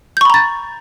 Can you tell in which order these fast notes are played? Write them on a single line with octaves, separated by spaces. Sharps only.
G6 C#6 B5 A#5 A6